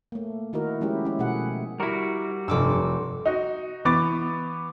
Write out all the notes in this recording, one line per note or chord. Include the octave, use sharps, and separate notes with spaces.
A3 A#3
D#3 D#4 E4 F#4 A#4
F3 G#3 C#4 E4 G4
C#4 E4
B2 F3 A3 G#4 F#5
G3 E4 F#4 A#4
F1 G2 D6 E6
D#4 F#4
E3 B3 C#6 D6 A6